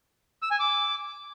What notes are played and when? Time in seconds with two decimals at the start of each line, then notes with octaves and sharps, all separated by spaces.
0.42 E6
0.51 G#5
0.60 D6